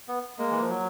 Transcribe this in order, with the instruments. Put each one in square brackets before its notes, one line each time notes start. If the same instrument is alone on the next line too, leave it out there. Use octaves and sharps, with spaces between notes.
[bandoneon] B3
[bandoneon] G#3 [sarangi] A#3
[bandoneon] E3
F3
F#3